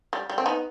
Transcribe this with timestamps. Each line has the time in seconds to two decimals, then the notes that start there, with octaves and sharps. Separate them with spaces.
0.13 G3
0.30 G3
0.38 C4
0.46 B3 D#4